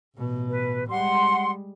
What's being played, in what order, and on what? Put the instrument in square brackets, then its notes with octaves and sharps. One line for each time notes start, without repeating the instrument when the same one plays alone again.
[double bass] A1 B2
[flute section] B4
[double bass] G3 G#3 [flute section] F#5 C6